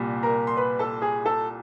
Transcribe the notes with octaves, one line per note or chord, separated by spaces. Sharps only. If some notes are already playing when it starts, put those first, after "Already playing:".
Already playing: C2 A#2 G3
A#4 A#5
C6
B4 B5
A4 A5
G#4 G#5
A4 A5